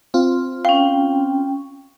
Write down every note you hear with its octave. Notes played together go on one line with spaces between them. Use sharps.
C4 F4
C#4 F5 G5